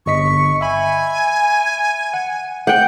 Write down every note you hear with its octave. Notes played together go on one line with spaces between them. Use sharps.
G1 D#5 C#6 B6
E5 G#5 B5
F#5
F#5 G5 G6